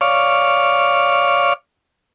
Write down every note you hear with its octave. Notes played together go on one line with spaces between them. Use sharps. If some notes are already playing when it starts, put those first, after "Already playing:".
C#5 D5 F5